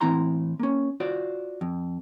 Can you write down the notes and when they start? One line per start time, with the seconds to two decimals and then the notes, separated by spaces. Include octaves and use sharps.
0.01 A2 E3 C4 E4 A#5 C6
0.60 A#3 C#4
1.00 F4 F#4 C5 D5
1.61 F2